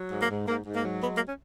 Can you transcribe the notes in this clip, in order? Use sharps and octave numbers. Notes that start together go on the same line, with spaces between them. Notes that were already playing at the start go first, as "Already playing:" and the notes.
Already playing: F#3
G#2
A#3
G#2
G#2 A#3
G#2
A#3
F#3
G#3 B3
A#3
C#4